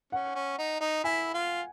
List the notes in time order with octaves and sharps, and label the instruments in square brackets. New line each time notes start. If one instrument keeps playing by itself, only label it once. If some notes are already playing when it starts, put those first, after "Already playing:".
[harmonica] C#4 [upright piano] F#5
[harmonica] C#4
D#4
D#4
[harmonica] E4 [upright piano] G#5
[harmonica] F4